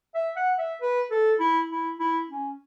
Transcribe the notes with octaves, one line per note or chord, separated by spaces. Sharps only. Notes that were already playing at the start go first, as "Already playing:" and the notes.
E5
F#5
E5
B4
A4
E4
E4
E4
C#4